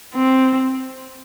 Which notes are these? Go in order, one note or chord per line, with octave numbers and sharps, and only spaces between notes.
C4